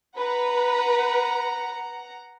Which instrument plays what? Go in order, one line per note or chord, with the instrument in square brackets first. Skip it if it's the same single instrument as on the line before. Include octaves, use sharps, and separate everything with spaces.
[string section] B4 [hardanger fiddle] F#5 A#5